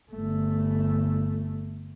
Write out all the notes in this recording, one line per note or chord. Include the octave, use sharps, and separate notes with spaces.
G1 A3